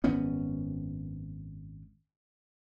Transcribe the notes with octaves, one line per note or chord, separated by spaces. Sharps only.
G#1 F#2 B3 C#4